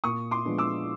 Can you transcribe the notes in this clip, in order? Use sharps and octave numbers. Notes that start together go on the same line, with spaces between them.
A#2 C#6 D#6
C6 D6
F3 G#3 B3 D4
D6 E6